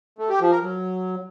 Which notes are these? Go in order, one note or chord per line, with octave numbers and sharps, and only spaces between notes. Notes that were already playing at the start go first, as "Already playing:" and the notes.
A3
G4
F3
A#4
F#3